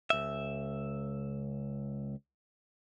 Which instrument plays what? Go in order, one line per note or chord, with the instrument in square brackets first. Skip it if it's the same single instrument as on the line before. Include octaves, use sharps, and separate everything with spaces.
[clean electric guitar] C#2 E5